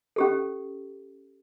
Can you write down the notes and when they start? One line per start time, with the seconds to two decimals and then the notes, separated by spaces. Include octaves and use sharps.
0.16 C#4 G4 A4